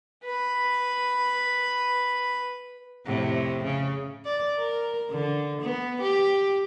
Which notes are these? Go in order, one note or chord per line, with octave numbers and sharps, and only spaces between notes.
B4 B5
F2 A2 C3
C#3
D5
A#4
D3
B3
G4